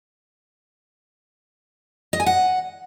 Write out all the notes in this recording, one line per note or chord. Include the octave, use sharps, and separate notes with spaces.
D#5
G#5
F#5